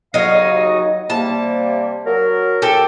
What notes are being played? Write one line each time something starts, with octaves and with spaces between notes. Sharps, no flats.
F2 D3 F#3 D#4 F5
D#2 C#3 D#5
C3 G3 A#3 A5
F#3 A#4
G4 A4